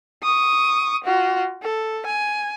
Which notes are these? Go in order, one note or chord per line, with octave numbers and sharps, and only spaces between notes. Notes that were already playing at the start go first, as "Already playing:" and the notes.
C#6 D#6
F4 F#4
A4
G#5